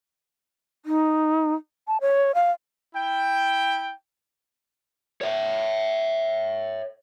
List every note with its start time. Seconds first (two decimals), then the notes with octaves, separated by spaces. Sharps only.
0.85 D#4
1.87 A5
2.01 C#5
2.35 F5
2.95 E4 G5
5.21 C#5 E5